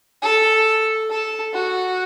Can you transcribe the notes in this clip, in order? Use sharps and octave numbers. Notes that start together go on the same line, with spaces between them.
A4
A4
F#4